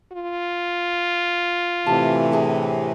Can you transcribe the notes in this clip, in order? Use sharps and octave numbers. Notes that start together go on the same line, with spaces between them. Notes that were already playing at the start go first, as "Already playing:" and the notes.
F4
A2 C3 E3 G4 A5
D4 G4 G#4